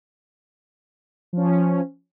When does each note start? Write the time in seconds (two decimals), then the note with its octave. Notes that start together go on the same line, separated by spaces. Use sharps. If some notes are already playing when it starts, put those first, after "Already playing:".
1.33 F3 C#4